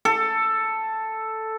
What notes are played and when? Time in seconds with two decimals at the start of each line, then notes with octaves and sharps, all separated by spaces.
0.05 A4